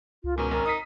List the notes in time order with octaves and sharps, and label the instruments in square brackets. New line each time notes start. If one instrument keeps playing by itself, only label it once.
[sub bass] C#2 [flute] F4
[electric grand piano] G#2 B2 [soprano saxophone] C#4 [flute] A#4
[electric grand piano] G#1 [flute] A#4
[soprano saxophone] D#4 [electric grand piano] D#6 B6